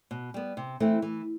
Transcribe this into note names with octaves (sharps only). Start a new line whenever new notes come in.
B2
G3 B3
C3
E3 A3 C4 E4
E3